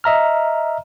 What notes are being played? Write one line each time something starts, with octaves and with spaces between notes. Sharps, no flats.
D#5 E5 A#5 F6